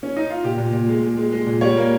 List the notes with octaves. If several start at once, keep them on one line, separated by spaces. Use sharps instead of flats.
C#4
D#4
F4
A#2 G4
A#2
A#2
G#3
G#3
G#3
G#3
A#2
G3 C#5
A#3